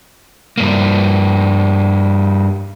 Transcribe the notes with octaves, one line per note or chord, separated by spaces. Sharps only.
G2 A#3